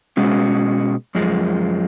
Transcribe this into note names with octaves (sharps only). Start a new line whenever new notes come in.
B2 G#3 C#4 F#4
F#2 F3 G#3